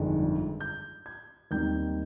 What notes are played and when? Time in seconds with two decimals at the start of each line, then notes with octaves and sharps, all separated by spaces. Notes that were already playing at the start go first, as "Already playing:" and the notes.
Already playing: G1 F2 D#3 G#3 D4
0.60 G6
1.06 G#6
1.51 D#2 D#3 G3 C4 D#4 G6